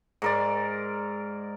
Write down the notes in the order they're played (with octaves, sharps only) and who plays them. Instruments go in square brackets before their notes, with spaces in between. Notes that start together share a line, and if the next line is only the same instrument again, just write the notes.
[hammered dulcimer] G#2 A#4 D5